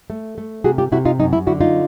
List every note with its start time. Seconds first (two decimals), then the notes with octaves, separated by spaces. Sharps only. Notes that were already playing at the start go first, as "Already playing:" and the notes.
0.10 A3
0.38 A3
0.64 C3 F#4 G#4
0.78 F4 G4
0.92 C3 E4 F#4
1.05 D#4 F4
1.19 F#2 D#4
1.33 E4
1.47 D3 E4 F#4
1.61 D#4 F4